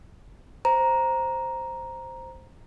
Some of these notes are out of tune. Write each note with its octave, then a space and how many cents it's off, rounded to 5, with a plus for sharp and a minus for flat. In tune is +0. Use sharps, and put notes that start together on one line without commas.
C5 +0 A#5 +5